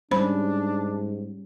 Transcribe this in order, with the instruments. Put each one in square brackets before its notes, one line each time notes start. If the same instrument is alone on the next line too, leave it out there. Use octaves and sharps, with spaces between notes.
[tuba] G#2 [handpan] G3 C#4 [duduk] D4 [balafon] C5 B5